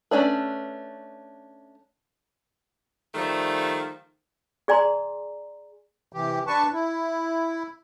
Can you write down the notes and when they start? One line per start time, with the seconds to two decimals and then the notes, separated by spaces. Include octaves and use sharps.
0.11 A3 A#3 C#4 D4 B4
3.14 D#3 F3 G3 A3
4.68 G#4 D5 G#5 A#5 C6
6.13 C3 E3 G4
6.47 D4 B4 A5 C#6
6.73 E4